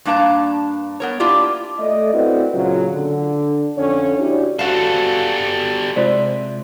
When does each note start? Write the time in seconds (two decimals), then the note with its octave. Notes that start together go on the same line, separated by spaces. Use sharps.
0.05 G2 A#3 D4 F5 A5 A#5
1.00 B3 A#4 C#5
1.20 A#3 D4 E4 F4 G4 D5
1.79 A3 D5 D#5
2.14 C4 E4 F#4 A4 B4 D5
2.54 A#2 C#3 F#3 A#3 F4 F#4
2.91 D3
3.77 F2 D3 C#4 C#5
4.18 C#4 D4 E4 F#4 G4 D5
4.59 G3 F#4 A4 F5
5.96 C3 G#3 F4 C5 D5 E5